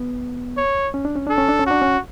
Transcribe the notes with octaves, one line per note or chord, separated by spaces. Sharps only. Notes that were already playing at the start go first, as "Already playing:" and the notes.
Already playing: B3
C#5
C#4
D4
C#4
D4 A4
C#4
D4
C#4
D4 F#4
C#4